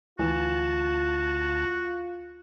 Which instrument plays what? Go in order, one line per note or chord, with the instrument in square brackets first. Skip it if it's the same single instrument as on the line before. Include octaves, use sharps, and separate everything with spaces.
[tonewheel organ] D2 A5 [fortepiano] E3 [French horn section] F4 [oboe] F#4